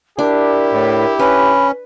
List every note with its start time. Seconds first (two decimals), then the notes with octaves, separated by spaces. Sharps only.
0.19 D4 E4 G4 A#4
0.72 A2
1.19 C#4 B4 B5